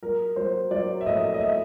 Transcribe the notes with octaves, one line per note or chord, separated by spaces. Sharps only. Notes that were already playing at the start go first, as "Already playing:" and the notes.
F#3 A#4
F#3 C5
F#3 D5
E5
A2 D#5
D#5
E5